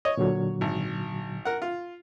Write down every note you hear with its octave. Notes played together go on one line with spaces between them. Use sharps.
C#5 D#5
A#2 D3 F#3
G#1
A#4 F#5
F4